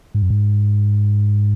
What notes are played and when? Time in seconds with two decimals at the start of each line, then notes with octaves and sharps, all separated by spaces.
0.15 G#2
0.22 F#2
0.30 G#2